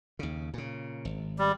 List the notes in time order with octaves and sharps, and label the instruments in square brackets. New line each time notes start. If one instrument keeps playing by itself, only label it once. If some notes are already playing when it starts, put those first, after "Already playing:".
[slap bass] D#2 C#3
A#2 C#3
G#1
[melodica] G3